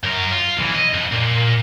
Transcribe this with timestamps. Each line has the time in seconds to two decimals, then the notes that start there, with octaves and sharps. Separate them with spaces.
0.04 F#2 A#4
0.31 F4
0.57 B1 E3
0.75 D#5
0.94 F2
1.12 A#2